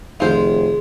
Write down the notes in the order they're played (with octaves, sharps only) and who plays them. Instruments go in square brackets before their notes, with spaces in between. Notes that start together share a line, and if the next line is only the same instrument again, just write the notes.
[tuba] F1 [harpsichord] D#3 G#3 [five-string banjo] F4 C5 F5